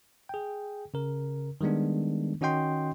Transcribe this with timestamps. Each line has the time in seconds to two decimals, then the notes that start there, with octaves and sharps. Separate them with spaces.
0.29 G#4 G5
0.94 C#3 A#4
1.61 D#3 G3 G#3 B3 D4
2.41 D#3 C#4 F#4 D#5 G5 C6